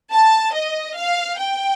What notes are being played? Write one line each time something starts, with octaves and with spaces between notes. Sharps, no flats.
A5
D#5
F5
G5